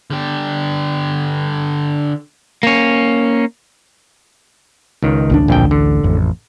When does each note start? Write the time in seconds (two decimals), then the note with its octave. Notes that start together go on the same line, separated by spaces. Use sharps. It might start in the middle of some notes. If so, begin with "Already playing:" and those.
0.10 D3 G4
2.63 A#3 C#4
5.03 C#2 D#3
5.30 A1 D2 D4
5.48 A#1 F2 G5
5.71 D3
6.03 A1 F2